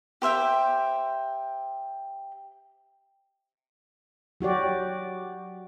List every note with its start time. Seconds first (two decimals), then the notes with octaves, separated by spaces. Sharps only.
0.22 G4 C5 E5 G5
4.41 F#3 F#4 G4 D5